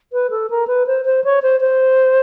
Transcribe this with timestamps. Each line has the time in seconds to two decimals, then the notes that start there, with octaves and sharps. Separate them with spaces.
0.13 B4
0.30 A4
0.50 A#4
0.68 B4
0.87 C5
1.05 C5
1.24 C#5
1.42 C5
1.61 C5